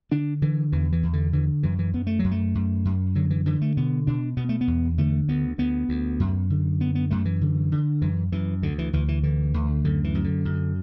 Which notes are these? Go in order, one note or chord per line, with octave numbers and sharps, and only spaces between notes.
D3 D4
D3 E3
E2 E3
E3
E2
D3
D3 E3
F#2 E3
E3
F#2 B3
A3
F#2 F#3
A3
F#2
F#2
D3 F#3
E3
D3 E3
A3
B2 B3
B2 D4
B2 B3
A3
B3
E2
D3 A3
D2 B3
D2 B3
D2
F#2
D3
F#2 B3
B3
F#2 A3
E3
D3
D3
F#2 E3
F#2 E3
D2 D3
E3
D2 E3
E3
D3 E3
D2
F#2 D3
E3
F#2
D3
F#2